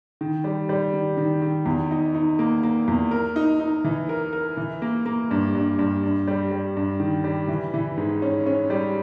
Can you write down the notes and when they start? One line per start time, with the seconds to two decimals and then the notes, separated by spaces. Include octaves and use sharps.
0.21 D#3
0.44 G3
0.69 G3
0.94 D#3
1.17 D#3
1.42 D#3
1.66 E2
1.91 D#4
2.15 D#4
2.39 A#3
2.63 A#3
2.88 E2
3.11 A#4
3.36 D#4
3.60 D#4
3.85 E3
4.09 A#4
4.33 A#4
4.57 E3
4.82 A#3
5.06 A#3
5.31 G2
5.55 G2
5.79 G2
6.03 G2
6.28 G3
6.52 G3
6.77 G2
7.00 D#3
7.24 G3
7.48 E3
7.74 E3
7.97 G#2
8.22 C#4
8.46 C#4
8.70 G3